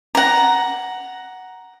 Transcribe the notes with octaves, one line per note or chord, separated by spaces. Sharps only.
F#5 A#5